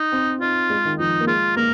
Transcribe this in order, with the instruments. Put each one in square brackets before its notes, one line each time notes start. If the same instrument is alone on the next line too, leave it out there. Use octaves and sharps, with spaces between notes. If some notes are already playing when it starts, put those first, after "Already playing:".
Already playing: [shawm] D#4
[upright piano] C4
[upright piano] D#4 [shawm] F4
[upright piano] G#3
D#3
[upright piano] F3 [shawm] D#4
[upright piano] A#3
[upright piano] G#3 [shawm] F4
[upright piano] A#3 [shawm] A#4